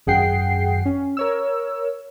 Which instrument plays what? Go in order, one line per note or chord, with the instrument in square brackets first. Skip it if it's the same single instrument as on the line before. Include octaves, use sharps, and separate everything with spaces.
[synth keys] G#1 F#2 G#4 F#5 G5 C7
C#4
A#4 C#5 E6